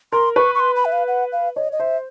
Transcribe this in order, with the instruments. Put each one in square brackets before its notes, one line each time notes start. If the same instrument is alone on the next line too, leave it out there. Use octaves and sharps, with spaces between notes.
[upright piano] A#4 [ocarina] C6
[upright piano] B4 [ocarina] C#6
[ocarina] C#6
C6
B5
E5
F5
F#5
F5
[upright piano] C#5 [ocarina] D#5
[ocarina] D#5
[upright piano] C5 [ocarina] E5